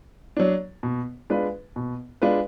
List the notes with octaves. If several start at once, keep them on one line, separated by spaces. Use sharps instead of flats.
F#3 D4
B2
G#3 D4 F4 B4
B2
G#3 D4 F4 B4